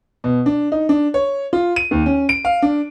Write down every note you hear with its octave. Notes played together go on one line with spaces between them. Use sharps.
B2
D4
D#4
D4
C#5
F4
D#7
D#2
C#4
D7
F5
D4